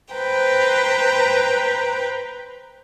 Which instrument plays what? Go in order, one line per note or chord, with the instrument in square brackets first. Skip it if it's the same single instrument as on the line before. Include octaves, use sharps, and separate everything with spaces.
[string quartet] B4 C5 G5 A#5